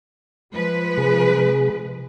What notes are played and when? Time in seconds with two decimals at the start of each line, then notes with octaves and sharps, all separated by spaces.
0.53 F3 G#3 B4
0.98 C3 G#4